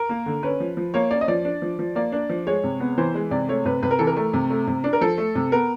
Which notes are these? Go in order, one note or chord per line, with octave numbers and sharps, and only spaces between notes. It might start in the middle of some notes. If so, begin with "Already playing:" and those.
Already playing: A#4
A#3
D3
C#4 B4
F3
F3
A#3 C#5
C#4 D5
D#5
F3 D5
D4
F3
F3
A#3 D5
D4
F3
G#3 C#5
C3
B3
E3 C5
G#3
C3 D5
A3 C#5
C3 B4
C3 B4
A#4
E3 A4
A#4
A3
C3
A3
C3
D4
A#4
F3 A4
A3
C3
B3 A#4